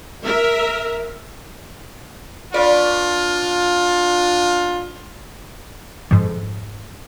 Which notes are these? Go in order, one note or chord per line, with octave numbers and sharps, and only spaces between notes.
A#4 E5
D4 F4 B4 C#5 D5
F2 G#2